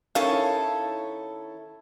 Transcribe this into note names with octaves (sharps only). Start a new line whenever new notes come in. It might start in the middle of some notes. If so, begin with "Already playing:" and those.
D#3 C#4 E4 A4 C#5 F5